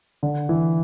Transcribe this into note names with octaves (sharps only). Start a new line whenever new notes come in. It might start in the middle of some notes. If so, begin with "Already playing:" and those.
D3
E3